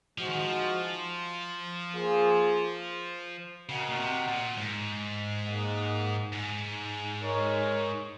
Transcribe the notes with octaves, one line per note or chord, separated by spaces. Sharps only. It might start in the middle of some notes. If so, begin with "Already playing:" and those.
F3 G#3 D#4 F#4 C5
D#3
F3
A#3 F4 G#4 C5
C#3 F#4 A#4 D#5 F#5
A#2
C3
A#2
G#2
A#3 D#4 G#4 D#5 F#5
G#2
G#3 D#4 A#4 C#5